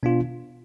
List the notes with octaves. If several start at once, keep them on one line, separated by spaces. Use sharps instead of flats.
B2 B3 D4 F4